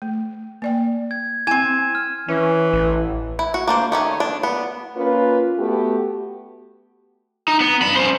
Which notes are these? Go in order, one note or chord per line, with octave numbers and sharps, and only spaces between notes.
A3
A#3 D5 G5
G#6
C4 E4 G#5 G#6 D#7 E7
F6
E3 C#4
A1
E4
F#4
A#3 D4 C5
D#3 A3 C#4
D4
B3
A#3 C#4 F4 B4
A3 B3 F#4 G4
D#4
B3
G2 B5
C#4 C5